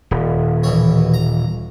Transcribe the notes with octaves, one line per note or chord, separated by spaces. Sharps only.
D#1
B2 E3 C#5
A#5